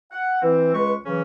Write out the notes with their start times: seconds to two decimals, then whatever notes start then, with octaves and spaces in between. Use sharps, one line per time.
0.12 F#5
0.42 E3 C4
0.73 C#2 G#3 B4 C#6
1.05 C#3 E3 F#3 C#4